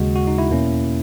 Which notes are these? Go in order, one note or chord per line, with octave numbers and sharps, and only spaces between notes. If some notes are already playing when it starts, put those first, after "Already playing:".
Already playing: D#2 C#3 G#3 F#4
F#4
D#4
E4
E2 B2 A#3 C#4